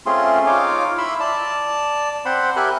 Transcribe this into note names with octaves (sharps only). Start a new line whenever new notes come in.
A3 C4 C#4 F4 G#4 C6
D#4 F4 C#5 F5 D6
E4 E5 B5 C6 E6
D5 A5
C4 C5 F#5 B5 C6
G4 A#4 E5 G#5 B5 F#6